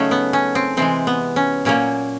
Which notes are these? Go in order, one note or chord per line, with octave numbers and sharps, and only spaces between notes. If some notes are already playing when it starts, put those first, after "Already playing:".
Already playing: C#3 F#3 A3 C#4 D#4
B3
C#4
C4
C3 E3 G#3 C4
B3
C#4
A#2 F#3 A#3 C#4